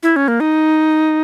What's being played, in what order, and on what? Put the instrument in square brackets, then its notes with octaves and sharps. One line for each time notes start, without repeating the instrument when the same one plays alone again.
[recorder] E4
C#4
A#3
D#4